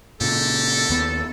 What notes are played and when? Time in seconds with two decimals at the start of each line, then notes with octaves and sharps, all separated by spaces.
0.21 A#2 C#3 G4 A4
0.90 D#2 B3